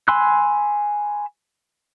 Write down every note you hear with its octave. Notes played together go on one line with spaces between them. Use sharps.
G#5 B5 C6 E6 F#6